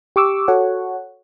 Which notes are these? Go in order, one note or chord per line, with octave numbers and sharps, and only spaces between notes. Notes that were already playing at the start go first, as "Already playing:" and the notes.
G4 C#6 D6 E6
F#4 A4 C#5 F#5